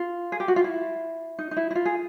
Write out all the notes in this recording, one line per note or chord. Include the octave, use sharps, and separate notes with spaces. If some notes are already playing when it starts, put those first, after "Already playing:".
Already playing: F4
G#4
G4
F#4
F4
E4
D#4
D#4
E4
E4
F4
G#4